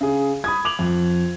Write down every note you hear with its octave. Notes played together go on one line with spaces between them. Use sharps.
C#3 G#4
B5 D#6 G#6
D6 F7 F#7
F2